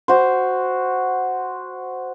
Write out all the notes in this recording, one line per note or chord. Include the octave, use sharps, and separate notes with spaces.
F#4 C5